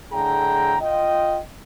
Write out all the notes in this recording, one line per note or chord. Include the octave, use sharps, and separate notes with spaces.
A2 D3 G#4 G5 A#5
F4 D#5 G5